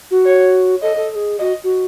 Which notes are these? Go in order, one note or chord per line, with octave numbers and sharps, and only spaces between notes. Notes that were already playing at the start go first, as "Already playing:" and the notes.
F#4
C#5
A4 D#5
A4
A4
G#4
F#4 D#5
F#4